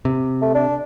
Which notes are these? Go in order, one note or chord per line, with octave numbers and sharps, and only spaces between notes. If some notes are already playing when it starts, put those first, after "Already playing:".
C3
A3
D4